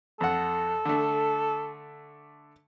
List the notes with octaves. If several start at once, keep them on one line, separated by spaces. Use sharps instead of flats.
F2 A4 F#5
D3 A3